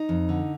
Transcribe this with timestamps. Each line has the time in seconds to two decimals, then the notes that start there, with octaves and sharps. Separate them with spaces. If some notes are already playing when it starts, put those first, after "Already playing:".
Already playing: D#4
0.09 F2
0.29 D3